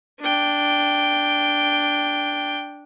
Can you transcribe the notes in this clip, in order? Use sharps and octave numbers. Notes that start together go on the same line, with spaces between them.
D4 G5